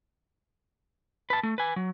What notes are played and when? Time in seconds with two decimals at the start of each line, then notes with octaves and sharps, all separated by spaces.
1.30 B4 A5
1.43 A3
1.58 B4 G#5
1.76 F#3